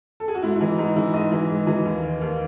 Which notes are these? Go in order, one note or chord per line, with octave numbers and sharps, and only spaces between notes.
A4
G#4
F#4
G#2 E4
E4
E3 D#4
G#2 D#4
E3 E4
G#2 D#5
E3
G#2
E3
D#2
D#3
D#2